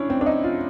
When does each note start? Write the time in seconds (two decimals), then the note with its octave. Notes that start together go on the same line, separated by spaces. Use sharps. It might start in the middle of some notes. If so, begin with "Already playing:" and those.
Already playing: C#4 D4 E4
0.10 C4
0.21 D4
0.26 D#4
0.44 F4